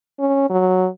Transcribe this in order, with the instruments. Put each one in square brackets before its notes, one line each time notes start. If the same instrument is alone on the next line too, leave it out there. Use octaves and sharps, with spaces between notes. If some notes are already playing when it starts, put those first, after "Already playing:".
[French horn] C#4
F#3